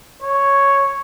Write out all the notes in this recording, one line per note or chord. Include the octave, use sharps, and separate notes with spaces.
C#5